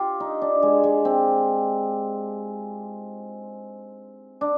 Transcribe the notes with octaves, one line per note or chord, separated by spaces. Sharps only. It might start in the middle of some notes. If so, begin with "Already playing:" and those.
Already playing: F4 G4
D#4
D4
G#3
G#3
C4
D4